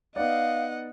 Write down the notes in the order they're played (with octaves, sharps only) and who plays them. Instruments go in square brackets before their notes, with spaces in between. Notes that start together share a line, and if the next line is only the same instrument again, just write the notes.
[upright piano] B3 D#4 D5 [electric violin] D#5 F#5 [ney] F5